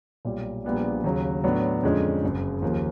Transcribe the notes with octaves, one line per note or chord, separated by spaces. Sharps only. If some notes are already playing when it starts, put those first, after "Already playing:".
B1 A#2 G3
A#1 A#2 G3 B3 D4
D#2 C#3 F#3
A2 F#3 B3 D4
F2 D3 F3 G#3 C#4
F#1 F#2 C#3
D#2 C#3 F3 A#3